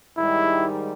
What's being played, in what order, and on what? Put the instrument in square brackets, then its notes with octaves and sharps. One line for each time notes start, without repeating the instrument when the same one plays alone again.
[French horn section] G#2 D#3 G3 [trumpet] E4